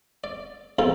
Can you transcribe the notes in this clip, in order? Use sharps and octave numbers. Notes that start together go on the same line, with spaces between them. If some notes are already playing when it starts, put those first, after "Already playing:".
D5
B1 F3 F4 A4 A#4 C5